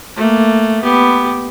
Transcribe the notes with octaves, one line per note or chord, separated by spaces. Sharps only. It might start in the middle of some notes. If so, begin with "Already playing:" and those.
A3 A#3
B3 G4